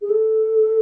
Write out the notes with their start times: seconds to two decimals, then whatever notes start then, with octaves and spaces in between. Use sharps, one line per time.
0.01 G#4
0.09 A4